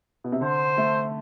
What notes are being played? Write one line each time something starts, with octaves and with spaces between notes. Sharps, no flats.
B2
C3
D3 C5
A3